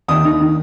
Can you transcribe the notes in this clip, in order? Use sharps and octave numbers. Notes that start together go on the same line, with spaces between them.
D#2 D#6
D#3
D#3